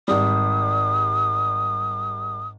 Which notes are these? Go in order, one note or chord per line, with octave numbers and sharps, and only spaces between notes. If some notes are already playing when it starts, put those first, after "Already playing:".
G#1 G3 D#6